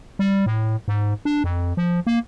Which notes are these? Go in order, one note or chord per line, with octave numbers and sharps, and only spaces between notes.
G3
A2
G#2
D4
F2
F3
A#3